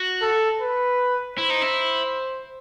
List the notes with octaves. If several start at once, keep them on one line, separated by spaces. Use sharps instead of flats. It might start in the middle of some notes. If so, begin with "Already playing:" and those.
Already playing: F#4
A4
B4
E4 C5
D#4
E4